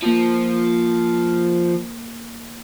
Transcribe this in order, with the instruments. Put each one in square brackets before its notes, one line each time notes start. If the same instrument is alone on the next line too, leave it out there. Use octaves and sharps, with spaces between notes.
[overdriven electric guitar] F3 [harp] A#3 A#5